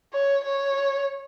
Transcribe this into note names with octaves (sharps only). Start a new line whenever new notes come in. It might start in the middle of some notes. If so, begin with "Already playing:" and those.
C#5
C#5